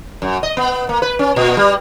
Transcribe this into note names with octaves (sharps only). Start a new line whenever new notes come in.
F#2
D#5
B3
A#3
B4
C#4
A#2
G3